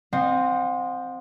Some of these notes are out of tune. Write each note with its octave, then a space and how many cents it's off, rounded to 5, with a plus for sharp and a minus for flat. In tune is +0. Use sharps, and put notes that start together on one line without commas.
C4 +0 D#5 -15 F#5 -45